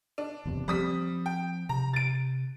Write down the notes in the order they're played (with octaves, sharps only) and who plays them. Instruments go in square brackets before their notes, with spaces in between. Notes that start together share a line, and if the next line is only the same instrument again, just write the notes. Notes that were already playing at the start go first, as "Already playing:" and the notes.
[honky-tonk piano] D4
[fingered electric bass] F#1 E2 C3
[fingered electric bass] F3 C4 [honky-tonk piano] G3 D#6 B6
[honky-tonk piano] G5
[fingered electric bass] C3 [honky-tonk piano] A#5
[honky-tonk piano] A6 D7